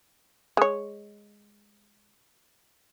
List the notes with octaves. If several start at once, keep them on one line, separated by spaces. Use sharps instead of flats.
G#3 C#5